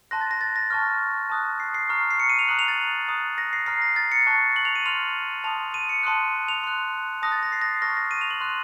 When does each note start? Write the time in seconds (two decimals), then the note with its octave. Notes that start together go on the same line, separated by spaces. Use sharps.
0.11 A5 C6 F#6 A#6
0.21 A6
0.31 A#6
0.41 A6
0.56 A#6
0.70 A5 C#6 F6
1.30 A5 D#6 F#6
1.60 C7
1.74 C7
1.89 A#5 C#6 F6
2.10 C7
2.20 C#7
2.29 D#7
2.39 F7
2.48 A#5 D#6 F#6 F#7
2.59 F7
2.68 A6
3.08 A#5 D#6 F#6
3.38 A#6
3.53 C7
3.66 A#5 F6 C7
3.82 A#6
3.96 A6
4.12 C#7
4.26 A5 C#6 F#6
4.56 F#7
4.65 F7
4.75 D#7
4.85 C6 F6 F7
5.44 A5 C6 D#6 F7
5.74 D#7
5.89 C#7
6.03 A5 C6 D#6 F#6
6.48 F7
6.64 C6 F#6
7.22 A5 D#6 F#6 A#6
7.32 A6
7.43 A#6
7.52 C7
7.62 A#6
7.81 A5 C#6 F6 A#6
7.97 A#6
8.11 D#7
8.21 F7
8.30 F#7
8.41 C6 F#6